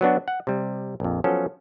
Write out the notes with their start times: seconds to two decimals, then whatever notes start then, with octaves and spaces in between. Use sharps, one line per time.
0.01 F#3 B3 D4 F#4
0.28 F#5
0.47 C3 G3
1.00 A#1 F2
1.24 F3 F#3 B3 C#4 A4